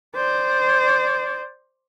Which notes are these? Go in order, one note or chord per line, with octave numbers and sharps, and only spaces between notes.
C5 D5